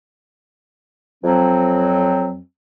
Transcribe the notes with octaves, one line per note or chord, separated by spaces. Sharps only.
F2 F#3 C4